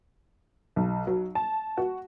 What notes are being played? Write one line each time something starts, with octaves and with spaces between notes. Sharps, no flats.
B1
F#3
A5
F#4